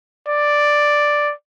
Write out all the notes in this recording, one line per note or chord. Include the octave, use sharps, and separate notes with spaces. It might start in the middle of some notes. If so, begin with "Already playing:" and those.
D5